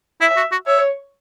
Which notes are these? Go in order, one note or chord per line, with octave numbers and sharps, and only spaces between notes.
E4 E5
F#4
F#4
C#5 E5